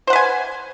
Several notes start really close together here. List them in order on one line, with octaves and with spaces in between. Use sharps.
C5 F#5 B4 G#5